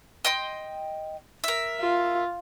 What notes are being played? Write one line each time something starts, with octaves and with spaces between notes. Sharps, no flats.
D#5 G5 C6
A#4 E5
F4